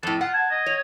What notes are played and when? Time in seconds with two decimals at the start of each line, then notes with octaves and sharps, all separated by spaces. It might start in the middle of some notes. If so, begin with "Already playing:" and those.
0.03 F2 A2 A4
0.21 F4 F#5
0.33 A5 G#6
0.51 D#5
0.66 C#5